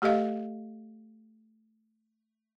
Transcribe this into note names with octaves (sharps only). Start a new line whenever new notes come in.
A3 G4 A4 D#5 F5